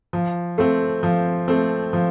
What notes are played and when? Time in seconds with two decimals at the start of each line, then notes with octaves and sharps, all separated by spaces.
0.13 F3
0.58 A3 C4
1.03 F3
1.48 A3 C4
1.93 F3